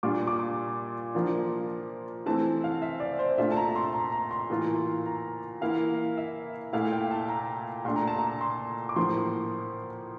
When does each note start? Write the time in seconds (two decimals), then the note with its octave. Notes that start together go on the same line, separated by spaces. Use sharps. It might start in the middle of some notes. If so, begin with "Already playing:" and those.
0.03 A#2 G3 D4 F4 D6
0.27 D6
1.14 F3 A#3 D4 F4
2.26 E3 A3 C4 A5
2.64 F5
2.82 E5
3.00 D5
3.19 C5
3.37 A#2 A3 D4 F4 E5
3.51 A5
3.57 A#5
3.76 C6
3.94 A#5
4.12 A#5
4.31 C6
4.50 A2 E3 A#3 F4
5.06 A#5
5.61 E3 A#3 E4 F5
6.17 E5
6.73 A#2 A3 E4 F5
6.92 G5
7.11 A5
7.29 A#5
7.85 A#2 A3 D4 C6
7.96 A#5
8.07 A5
8.18 A#5
8.41 C6
8.89 D6
8.96 A2 F3 A#3 C6